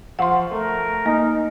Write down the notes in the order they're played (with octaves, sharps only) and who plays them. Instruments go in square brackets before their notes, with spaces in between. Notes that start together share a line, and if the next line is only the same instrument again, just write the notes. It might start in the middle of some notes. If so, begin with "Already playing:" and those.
[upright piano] F3 F5 C#6 [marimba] F#5 C6
[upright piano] A3 [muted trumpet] A#4
[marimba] A#3 [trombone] D#4